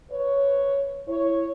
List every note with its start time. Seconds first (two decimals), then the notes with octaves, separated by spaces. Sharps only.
0.11 B4 C#5
1.08 E4 C#5